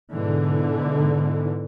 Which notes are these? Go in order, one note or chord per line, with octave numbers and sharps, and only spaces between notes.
G#2 B2 D3 E3